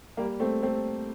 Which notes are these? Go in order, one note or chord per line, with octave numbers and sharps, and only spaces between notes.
G3 A#3
A3 C4
A3 C4